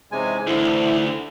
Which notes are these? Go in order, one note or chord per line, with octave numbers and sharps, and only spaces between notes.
C3 E3 G#3 C#4 D#4 G#5
D2 D3 E3 E4 C5